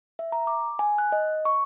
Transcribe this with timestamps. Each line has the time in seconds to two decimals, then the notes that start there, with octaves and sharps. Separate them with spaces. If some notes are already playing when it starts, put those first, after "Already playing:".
0.19 E5
0.32 A#5
0.47 D6
0.79 G#5
0.98 F#6
1.12 D#5
1.45 C#6